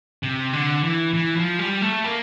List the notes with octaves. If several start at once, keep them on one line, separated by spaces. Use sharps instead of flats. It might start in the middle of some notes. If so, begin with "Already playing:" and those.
C3
D3
E3
E3
F3
G3
A3
A#3